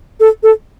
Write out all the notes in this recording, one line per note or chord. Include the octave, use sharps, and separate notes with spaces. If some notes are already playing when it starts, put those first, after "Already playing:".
A4
A4